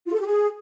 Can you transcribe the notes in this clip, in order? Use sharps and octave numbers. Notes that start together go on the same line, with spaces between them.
F4
A4
G4
G#4